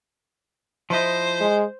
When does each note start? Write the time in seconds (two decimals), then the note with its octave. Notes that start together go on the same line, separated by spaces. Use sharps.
0.90 F3 E4 C5 D#5
1.41 G#3